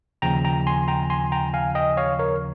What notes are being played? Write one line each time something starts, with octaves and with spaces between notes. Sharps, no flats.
D#2 C#3 F3 G5 A#5
G5 A#5
G#5 C6
G5 A#5
G#5 C6
G5 A#5
F5 G#5
D#5 G5
C#5 F5
A#4 C#5